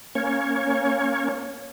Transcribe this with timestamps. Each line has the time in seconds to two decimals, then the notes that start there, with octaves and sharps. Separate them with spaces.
0.15 A#3 C#4 C#5